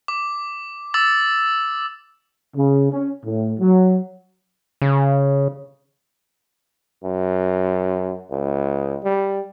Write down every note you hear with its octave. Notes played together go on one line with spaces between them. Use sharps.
D6
D6 E6 A6
C#3
C#4
A2
F#3
C#3
F#2
C#2
G3